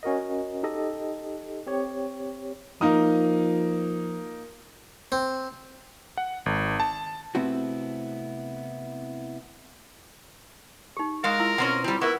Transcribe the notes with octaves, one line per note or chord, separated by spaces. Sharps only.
C#4 F#4 A#4 D#5
D#4 G4 A4 D#5
C4 G4 C#5
F3 A#3 D#4 D#6
C4
F#5
G#1
A5
C3 A3 B3 C4 E4 F#4
D#4 G4
G#3 A#4 F5
E4 F4 E6
B2 C4 C#4 F#5
G3 C4 E4 F4
B3 E4 A#4 E5 C#6